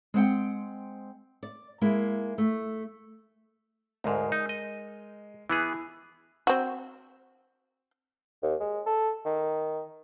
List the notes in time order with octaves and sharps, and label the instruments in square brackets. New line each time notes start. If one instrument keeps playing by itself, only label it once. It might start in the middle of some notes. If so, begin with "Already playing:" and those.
[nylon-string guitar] G#3 C4 F#5 G5
D5
G#3 A#3 E4
A3
[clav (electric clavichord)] D2 G#2 [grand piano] G#3 A#4
[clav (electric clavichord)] D#4
D#5
[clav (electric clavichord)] E3 B3 G#4 [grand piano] E4 G#5
[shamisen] C4 F#4
[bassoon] D#2
G#3
A4
D#3